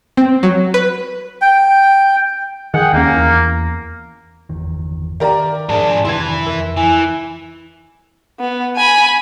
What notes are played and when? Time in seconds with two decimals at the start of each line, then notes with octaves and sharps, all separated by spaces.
0.17 C4
0.43 F#3
0.74 B4
1.42 G5
2.74 D#3 G#4 F#5 G5
2.93 D#2 G#3 A#3 C#4
3.14 E2
4.49 G1 E2 D#3
5.20 D#3 G4 A#4 D5 E5 F5 A#5
5.69 G#2 D4 G#4 A5 B5
6.05 F2 C3 D#3 E4 B4 C6 G#6
6.47 F2 A#4 E5
6.77 E3 G#5
8.40 B3
8.77 G#5 B5